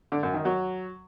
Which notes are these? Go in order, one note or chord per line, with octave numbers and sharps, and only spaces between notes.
D3
F#2
D#3
F#3